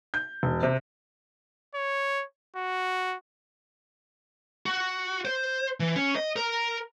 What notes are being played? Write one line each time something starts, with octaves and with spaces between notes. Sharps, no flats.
G6
E1
C3
C#5
F#4
F#4
C5
E3
C#4
D#5
A#4